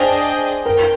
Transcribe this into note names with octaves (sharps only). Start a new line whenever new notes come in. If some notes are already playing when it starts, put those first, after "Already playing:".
Already playing: D4 G#4 C5 D#5 G5
A#4 G5